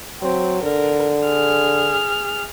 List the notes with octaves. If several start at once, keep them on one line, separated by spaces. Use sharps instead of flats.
F#3 C4
D3 A#4
G#4 F6